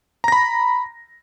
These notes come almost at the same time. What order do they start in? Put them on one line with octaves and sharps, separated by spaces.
A#5 A#6 B5